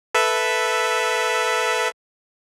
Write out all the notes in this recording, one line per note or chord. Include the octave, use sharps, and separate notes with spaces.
A4 B4 E5